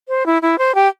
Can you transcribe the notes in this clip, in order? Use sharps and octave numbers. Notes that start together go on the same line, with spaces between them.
C5
E4
E4
C5
G4